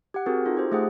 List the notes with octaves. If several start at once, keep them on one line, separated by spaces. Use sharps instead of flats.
G4 F#5
C4 F#4 G#4 A#4
D#4 F4 A4
G4 C5
A3 G4 G#4 C5 F#5